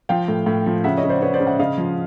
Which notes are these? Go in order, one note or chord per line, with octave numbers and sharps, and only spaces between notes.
F3 F5 G5
A2
A2
F3
C#3 E5 F#5
C#5 D#5
C#3
C5 D5
C#3 B4 C#5
C5 D5
C#3
E5 F#5
C#3 D#5 F5
F3